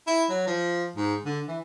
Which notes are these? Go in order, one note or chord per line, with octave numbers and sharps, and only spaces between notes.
E4
F#3
F3
G#2
D3
E3